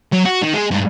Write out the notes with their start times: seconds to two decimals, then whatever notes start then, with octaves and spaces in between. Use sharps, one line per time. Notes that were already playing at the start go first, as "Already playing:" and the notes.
0.12 F#3 C#5
0.25 F#4
0.42 D#3
0.54 G#3 G#4
0.71 G2 G#3